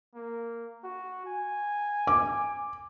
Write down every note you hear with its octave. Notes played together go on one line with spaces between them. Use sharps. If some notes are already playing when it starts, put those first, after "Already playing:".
A#3
F#4
G#5
D6